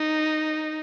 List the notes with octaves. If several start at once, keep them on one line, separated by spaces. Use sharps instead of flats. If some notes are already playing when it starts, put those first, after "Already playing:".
Already playing: D#4